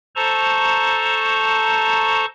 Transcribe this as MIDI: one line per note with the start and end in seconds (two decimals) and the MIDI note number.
0.16 2.25 69
0.16 2.25 72
0.16 2.25 81
0.16 2.25 82
0.16 2.25 85